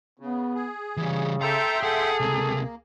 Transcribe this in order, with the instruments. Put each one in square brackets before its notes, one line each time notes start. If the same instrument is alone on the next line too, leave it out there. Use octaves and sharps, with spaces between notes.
[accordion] C#3 [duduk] B3
[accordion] G#4
[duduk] C#3 [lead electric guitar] E3 G3
[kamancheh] A4 [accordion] E5 G5 C6 [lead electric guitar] A#5
[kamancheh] G#4 [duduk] A4 [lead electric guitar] F5 F#5
[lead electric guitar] C#2 C3 [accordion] A#3